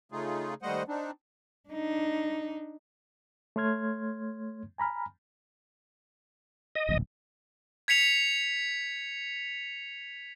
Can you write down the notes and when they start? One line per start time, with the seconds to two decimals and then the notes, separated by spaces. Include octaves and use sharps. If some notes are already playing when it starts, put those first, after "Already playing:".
0.12 C#3 A3 D#4 F4 G#4
0.62 D#2 G3 A3 C5 D#5 F#5
0.88 C4 D4 D#4
1.69 D4 D#4
3.56 A3 C#5 C6 F6 G#6
4.78 G#5 A#5 B5 F6
6.75 D#5
6.89 D1 A#1
7.88 G#6 B6 C#7 F7